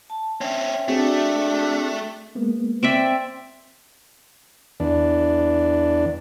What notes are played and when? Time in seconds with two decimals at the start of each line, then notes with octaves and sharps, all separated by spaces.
0.10 A5
0.41 C4 C#4 E5 G5
0.88 A3 C4 D4 F#4 G#4
2.35 G#3 A#3 B3
2.83 C4 D5 E5
4.80 E2 D4